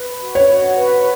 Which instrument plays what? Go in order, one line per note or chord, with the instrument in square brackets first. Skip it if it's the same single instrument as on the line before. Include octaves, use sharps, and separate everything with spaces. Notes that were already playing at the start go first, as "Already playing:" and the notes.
Already playing: [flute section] B4
F#4
[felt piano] C#5
[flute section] F#4
B4